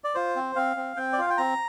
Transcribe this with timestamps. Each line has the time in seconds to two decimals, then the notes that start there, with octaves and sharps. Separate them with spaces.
0.04 D5
0.15 F4 C5
0.36 C4
0.56 C4 F5
0.77 C4
0.96 C4 G5
1.13 D5
1.18 F4 F5
1.30 G5
1.37 C4 A#5